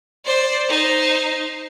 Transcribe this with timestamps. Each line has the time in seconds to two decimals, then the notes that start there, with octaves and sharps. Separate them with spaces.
0.25 C5 D5
0.68 D#4 C5